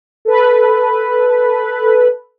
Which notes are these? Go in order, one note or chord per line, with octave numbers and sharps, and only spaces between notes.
A4 B4